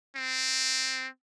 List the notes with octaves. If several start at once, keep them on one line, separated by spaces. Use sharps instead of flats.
C4